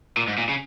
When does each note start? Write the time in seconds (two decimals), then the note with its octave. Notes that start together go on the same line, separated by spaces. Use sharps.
0.17 A#2
0.28 G#2
0.38 A#2
0.49 C#3